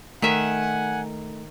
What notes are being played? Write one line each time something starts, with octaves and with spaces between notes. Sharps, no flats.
D#3 A3 E5 F#5 G#5